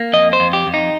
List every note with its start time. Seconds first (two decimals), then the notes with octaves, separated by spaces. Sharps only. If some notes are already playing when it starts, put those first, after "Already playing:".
Already playing: A#3
0.13 F2 D#5
0.33 C5
0.40 F2
0.53 G4
0.67 F2
0.74 D#4